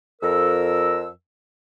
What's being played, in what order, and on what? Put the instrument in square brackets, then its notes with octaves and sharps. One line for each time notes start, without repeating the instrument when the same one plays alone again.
[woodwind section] F2 A#4 E6